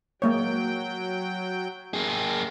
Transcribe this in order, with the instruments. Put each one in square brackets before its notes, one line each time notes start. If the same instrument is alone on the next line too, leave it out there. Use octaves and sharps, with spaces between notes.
[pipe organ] F#3 G5 [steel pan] G#3 A#3 C#5
[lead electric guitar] A#3 G#4